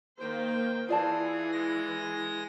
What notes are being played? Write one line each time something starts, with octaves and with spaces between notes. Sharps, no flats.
D#3 A#3 C5 G5
E3 F4 G#4 D5 A5
G#3 A#6